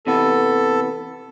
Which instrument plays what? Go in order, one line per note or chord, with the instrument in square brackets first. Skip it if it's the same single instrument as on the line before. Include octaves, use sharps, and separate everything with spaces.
[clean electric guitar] C3 E3 B3 [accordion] A4